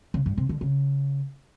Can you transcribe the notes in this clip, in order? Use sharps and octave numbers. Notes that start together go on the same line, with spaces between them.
C#3
G2
C3
D3
C#3